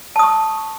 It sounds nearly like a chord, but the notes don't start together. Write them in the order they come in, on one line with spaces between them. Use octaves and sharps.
A5 D#6 C#6